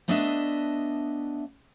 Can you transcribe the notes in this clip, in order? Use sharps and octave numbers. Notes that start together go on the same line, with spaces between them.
A3 B3 D4 D#5 E5